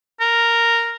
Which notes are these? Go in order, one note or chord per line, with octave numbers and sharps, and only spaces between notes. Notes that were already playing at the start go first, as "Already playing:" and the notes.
A#4